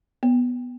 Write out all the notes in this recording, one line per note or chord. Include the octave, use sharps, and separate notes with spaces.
B3